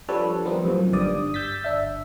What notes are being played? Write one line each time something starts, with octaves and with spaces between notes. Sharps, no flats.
F3 G3 D4 A4 B4 C#5
D#3 F3 G3 B3 C4 D#4
F#2 A2 C3 D#3 F3
G1 G2 D5 D#6
E6 G6 A6 B6
G1 D4 E5